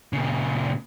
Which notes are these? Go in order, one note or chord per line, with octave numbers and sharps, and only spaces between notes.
A#2 C#3